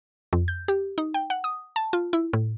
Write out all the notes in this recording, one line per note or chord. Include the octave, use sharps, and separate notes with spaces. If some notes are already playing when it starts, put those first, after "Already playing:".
F2
G6
G4
D#4
G5
F#5
D#6
A5
F4
E4
A2